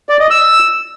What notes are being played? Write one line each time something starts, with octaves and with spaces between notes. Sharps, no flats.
D5
D#5
E6